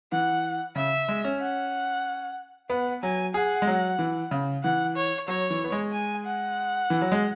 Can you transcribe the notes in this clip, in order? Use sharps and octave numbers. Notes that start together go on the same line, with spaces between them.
E3 F#5
C#3 E5
G#3
C#4
F#5
B3 F#5
F#3 G#5
G#4 F#5
G#3
F#3
E3
C#3
E3 F#5
C#5
F#3 C#5
E3
B3
G#3
G#5
F#5
E3
F#3
G#3